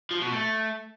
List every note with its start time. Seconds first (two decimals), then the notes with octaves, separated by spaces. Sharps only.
0.11 F3
0.21 B2
0.32 A3